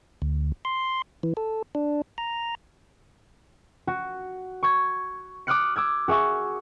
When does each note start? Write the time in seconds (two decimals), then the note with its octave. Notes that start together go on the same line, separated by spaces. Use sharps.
0.22 D2
0.65 C6
1.23 E3
1.37 A4
1.75 D4
2.18 A#5
3.87 F#4
4.63 C#6 G#6
5.47 D6 D#6 F6 F#6 C#7
5.76 D6 E6 G#6
6.08 F#4 G#4 E5 C#6